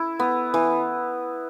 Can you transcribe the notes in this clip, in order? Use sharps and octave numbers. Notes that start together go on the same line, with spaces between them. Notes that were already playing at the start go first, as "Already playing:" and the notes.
Already playing: E4
B3
E3